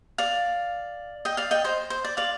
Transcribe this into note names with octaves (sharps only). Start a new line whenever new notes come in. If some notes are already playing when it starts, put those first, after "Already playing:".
D5 F5
D#5 G5
D5 F5
D#5 G5
C5 D#5
C5
D5
D5 F5